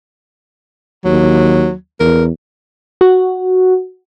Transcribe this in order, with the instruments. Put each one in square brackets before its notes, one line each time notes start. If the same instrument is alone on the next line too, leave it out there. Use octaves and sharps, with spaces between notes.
[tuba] D#2 [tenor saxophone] F#3
[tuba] E2 [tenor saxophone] A#4
[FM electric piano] F#4